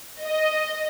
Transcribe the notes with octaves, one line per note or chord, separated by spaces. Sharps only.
D#5